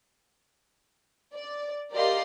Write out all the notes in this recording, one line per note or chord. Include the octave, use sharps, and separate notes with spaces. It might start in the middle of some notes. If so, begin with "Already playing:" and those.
D5
G4 A#4 D5 D#5 F5 C6